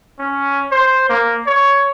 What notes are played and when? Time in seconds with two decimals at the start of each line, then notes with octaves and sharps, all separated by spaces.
0.19 C#4
0.71 C5
1.09 A#3
1.46 C#5